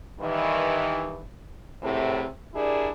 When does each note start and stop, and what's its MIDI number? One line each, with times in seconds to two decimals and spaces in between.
0.20 1.21 43
0.20 1.21 51
0.20 1.21 52
1.82 2.26 40
1.82 2.26 45
1.82 2.26 48
2.54 2.91 62
2.54 2.91 64
2.54 2.91 67
2.54 2.91 68
2.54 2.91 70
2.54 2.91 74